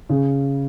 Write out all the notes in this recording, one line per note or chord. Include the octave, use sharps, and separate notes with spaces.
C#3